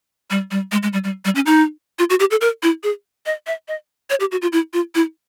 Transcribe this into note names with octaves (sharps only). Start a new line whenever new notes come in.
G3
G3
G#3
G#3
G3
G3
G3
C#4
D#4
F4
F#4
G4
A4
A#4
E4
G#4
D#5
E5
D#5
C#5
G4
F#4
F4
E4
F4
E4